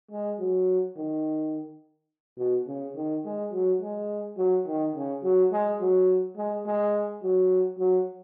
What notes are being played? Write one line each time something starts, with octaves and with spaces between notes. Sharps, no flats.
G#3
F#3
D#3
B2
C#3
D#3
G#3
F#3
G#3
F#3
D#3
C#3
F#3
G#3
F#3
G#3
G#3
F#3
F#3